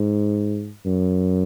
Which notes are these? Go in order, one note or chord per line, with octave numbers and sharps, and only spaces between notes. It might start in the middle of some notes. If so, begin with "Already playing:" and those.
Already playing: G#2
F#2